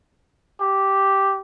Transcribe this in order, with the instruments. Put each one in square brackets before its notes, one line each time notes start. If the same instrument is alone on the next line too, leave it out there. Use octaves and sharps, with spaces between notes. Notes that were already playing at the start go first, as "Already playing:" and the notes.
[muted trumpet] G4